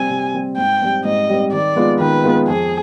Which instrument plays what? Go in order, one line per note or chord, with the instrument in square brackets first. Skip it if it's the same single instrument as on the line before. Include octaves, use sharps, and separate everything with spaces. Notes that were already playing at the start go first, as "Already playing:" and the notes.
Already playing: [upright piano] C3 G3 C4 [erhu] G#5
[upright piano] C3
G3 C4
[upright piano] G#2 [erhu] G5
[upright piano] G3 C4
[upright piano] G#2 [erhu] D#5
[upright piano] G3 C4
[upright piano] D#3 [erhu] D5
[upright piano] G#3 B3 F4
[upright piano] D#3 [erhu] B4
[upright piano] G#3 B3 F4
[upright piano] F2 [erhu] G#4